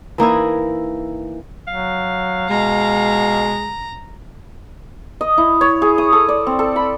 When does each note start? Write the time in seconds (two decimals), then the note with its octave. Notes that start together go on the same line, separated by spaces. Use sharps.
0.18 E3 A#3 D#4 E4
1.67 F#3 F5
2.50 B2 G#3 A#5
5.21 D#5
5.38 E4
5.61 C#5
5.82 G#4
5.98 D#6
6.13 A4
6.29 D5
6.47 C4
6.59 A4
6.76 B5